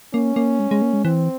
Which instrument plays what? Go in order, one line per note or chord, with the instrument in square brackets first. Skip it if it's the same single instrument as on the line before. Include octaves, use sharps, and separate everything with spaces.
[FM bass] A#3 [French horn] C#4
[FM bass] A#3
G#3
G#3
A#3
G#3
[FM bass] E3 [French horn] C4